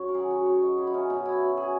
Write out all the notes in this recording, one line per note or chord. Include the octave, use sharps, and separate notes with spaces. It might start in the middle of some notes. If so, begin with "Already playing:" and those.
Already playing: F#2 C#5
A#4
D#3 F#3 G#4
F#4
F#2 C#5
D#5
D#3 F#3 E4
D#4
C#4
B2 D#4
E4
F#3
G#4